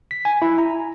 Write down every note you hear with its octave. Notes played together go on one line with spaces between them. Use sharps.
B6
G#5
E4
A#5